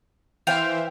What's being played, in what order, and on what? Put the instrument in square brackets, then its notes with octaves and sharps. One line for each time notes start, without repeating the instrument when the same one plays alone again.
[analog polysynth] E3 C5 E5 [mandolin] F5 G5